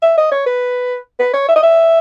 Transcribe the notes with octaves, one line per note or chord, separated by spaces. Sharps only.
E5
D#5
C#5
B4
B4
C#5
E5
D#5
E5